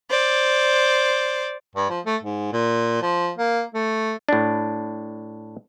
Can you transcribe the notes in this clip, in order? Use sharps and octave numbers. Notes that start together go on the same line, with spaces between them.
C5 D5
G2
F3
A3
G#2
A#2
F3
A#3
A3
A2 D4